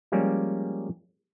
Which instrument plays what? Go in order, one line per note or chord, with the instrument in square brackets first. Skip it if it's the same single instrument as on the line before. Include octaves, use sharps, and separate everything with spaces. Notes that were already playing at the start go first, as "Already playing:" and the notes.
[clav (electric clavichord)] F3 G3 G#3 A#3 C#4 D5